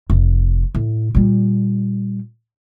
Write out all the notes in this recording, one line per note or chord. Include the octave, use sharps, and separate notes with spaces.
F1
A2
A#2 G3